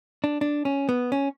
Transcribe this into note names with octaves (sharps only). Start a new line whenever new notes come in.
D4
D4
C#4
B3
C#4